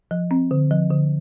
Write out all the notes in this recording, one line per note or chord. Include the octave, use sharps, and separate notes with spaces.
F3
C4
D3
F3
D3